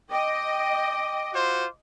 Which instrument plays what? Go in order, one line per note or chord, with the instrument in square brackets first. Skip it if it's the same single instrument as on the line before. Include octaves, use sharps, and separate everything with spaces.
[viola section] D#5 [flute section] G5 [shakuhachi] D6
[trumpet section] F4 F#4 C5